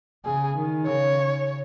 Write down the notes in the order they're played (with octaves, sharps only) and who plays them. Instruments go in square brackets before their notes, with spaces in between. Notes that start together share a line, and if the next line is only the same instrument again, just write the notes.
[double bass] C#3 [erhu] G#4
[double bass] D#3
[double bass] C#3 [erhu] C#5